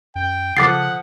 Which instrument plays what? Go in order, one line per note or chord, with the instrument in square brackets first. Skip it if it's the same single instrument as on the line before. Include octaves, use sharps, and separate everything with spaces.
[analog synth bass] F#2 [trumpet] G5
[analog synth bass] C#3 [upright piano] F3 A4 D#6 [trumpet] F#5 [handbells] D6 A6 C7